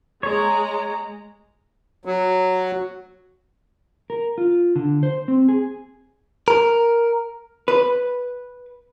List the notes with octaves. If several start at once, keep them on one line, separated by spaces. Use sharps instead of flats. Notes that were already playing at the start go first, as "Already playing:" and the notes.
G#3 C#5 A#5
F#3
A#4
F4
D3
C5
C4
G#4
A#4
B4